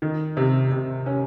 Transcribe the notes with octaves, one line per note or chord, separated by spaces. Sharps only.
D#3
C3
C3
C#4